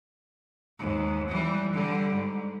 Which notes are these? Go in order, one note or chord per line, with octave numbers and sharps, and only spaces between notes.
D#2 G#2
E3 G3
D3 G3
G#2